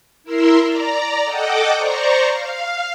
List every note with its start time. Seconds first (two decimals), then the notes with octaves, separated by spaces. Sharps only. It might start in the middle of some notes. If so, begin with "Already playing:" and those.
0.24 E4 A#4 E5 C6
0.63 D5 A#5
1.23 A4 D#5 F#5 G5 D6
1.75 C5 D5 A#5 C#6
2.31 F5